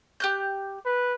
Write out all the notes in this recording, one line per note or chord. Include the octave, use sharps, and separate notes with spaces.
G4 F#6 G6
B4